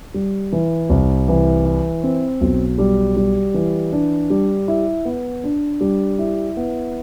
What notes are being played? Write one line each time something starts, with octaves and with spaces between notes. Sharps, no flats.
G3
E3
C2
E3
E4
C4
B1
G3
G3
E3
D4
G3
E4
B3
D4
G3
E4
B3